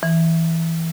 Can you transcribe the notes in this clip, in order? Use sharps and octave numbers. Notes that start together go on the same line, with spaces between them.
E3